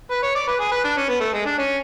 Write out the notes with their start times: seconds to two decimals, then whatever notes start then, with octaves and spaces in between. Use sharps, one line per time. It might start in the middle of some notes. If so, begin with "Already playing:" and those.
0.11 B4
0.23 C#5
0.35 D5
0.47 B4
0.60 G#4
0.71 B4
0.84 D4
0.97 C#4
1.09 B3
1.20 A3
1.33 G#3
1.46 D4
1.58 C#4